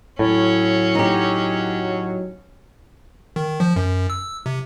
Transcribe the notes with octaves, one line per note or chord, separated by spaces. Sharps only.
A2 F#3 C#4
D#4 G4
D#3
F3
F#2
E6
C3